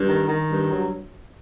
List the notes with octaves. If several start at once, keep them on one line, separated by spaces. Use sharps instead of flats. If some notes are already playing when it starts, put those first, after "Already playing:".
Already playing: G2
D#3
D#3
G2
F#3